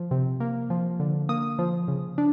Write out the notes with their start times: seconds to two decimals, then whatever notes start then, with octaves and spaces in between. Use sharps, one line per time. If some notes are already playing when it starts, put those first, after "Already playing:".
Already playing: F3
0.11 C3
0.40 A#3
0.70 F3
1.00 D3
1.29 A#3 D#6
1.59 F3
1.88 C#3
2.18 D4